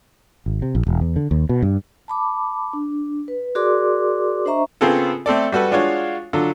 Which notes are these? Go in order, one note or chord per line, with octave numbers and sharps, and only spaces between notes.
G#1
C3
A#1
E1
E2
D3
D#2
B2
G2
A5 B5 D6
D4
B4
F#4 G#4 A#4 D5 C6 D6
D4 C5 D#5 E5 A#5 C#6
C#3 B3 C4 F4 G#4 A4
A3 C4 A4 D5
G3 F#4 A4 B4
G#3 D4 F4 F#4 C#5 F5
D3 F#3 F4 A4